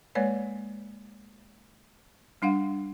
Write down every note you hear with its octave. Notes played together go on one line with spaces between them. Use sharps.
G#3 A#3 B4 C#5 D5
G3 D4 F5 F#5